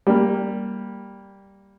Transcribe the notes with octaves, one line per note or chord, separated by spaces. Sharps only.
G3 A#3